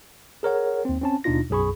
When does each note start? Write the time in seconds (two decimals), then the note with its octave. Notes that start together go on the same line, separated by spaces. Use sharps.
0.43 G#4 A#4 C#5 F#5
0.85 D#2 C4
1.02 C4 C#4 A5
1.24 D#2 B2 D4 D#4 F4 A#6
1.50 B1 F#2 G#4 B5 C#6